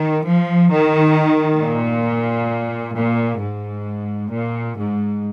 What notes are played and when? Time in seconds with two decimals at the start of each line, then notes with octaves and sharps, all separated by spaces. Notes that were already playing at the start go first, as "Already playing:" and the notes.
Already playing: D#3
0.25 F3
0.70 D#3
1.60 A#2
2.96 A#2
3.41 G#2
4.32 A#2
4.77 G#2